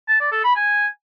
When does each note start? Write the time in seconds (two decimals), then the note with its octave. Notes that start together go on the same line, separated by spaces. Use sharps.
0.08 A5
0.20 D5
0.32 A4
0.44 B5
0.56 G#5